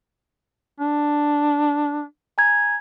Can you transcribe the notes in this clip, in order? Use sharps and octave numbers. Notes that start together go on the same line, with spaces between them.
D4
G#5 A#5 G#6